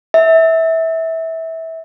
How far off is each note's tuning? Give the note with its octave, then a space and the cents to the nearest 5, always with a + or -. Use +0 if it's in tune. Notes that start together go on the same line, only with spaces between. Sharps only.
E5 -20